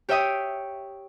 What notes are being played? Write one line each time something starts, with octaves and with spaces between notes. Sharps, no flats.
G4 C#5 E5 G5 D#6